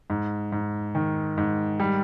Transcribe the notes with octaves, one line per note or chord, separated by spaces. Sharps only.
G#2
G#2
D#3
G#2
G3